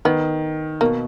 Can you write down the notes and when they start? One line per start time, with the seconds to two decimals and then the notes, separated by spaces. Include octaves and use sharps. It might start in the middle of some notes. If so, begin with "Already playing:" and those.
0.05 D#3 B3
0.81 B2 A#3